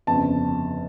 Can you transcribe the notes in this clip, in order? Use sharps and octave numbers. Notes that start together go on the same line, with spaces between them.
G1 F2 C#3 A5